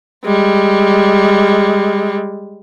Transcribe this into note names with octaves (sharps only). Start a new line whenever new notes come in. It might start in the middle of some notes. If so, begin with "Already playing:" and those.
G3 G#3